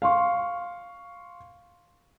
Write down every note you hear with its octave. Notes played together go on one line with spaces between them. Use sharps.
F5 C6 C#6